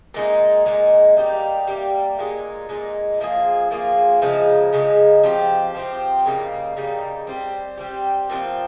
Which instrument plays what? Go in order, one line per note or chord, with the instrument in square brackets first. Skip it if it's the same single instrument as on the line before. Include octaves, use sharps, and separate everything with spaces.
[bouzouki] A#2 G#3 D#4
A#2 G#3 D#4
G3 A#3 D#4 G4
G3 A#3 D#4 G4
A#2 G#3 D#4
A#2 G#3 D#4
F3 A#3 F4 G#4
F3 A#3 F4 G#4
C#3 F3 G#3 D#4
C#3 F3 G#3 D#4
F3 C4 G4
F3 C4 G4
C#3 G3 A#3 D#4
C#3 G3 A#3 D#4
G3 C4 G4
G3 C4 G4
A#2 F3 C4